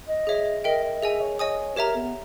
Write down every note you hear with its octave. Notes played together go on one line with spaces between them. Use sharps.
D#5
G#4 C#5 E5
A#4 D#5 E5 G5
D#5
G#4 D#5 E5 G#5
C#5
C#5 D#5 G#5 D#6
G4 A#4 C#5 E5 A#5
B3